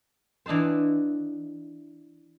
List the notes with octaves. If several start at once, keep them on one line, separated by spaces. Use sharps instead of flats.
E3 D4 D#4 F4 C5